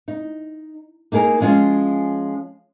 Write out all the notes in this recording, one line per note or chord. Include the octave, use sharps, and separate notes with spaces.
D#4
A#3 D#4 G#4 A#4
F3 G#3 C#4 F4